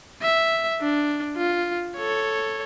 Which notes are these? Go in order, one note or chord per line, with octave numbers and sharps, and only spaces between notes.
E5
D4
F4
A4 C#5